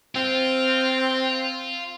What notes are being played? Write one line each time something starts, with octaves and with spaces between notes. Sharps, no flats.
C4 F4